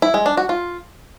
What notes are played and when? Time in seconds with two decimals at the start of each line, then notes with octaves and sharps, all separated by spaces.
0.02 E4
0.14 G#3
0.26 D4
0.37 F#4
0.49 F4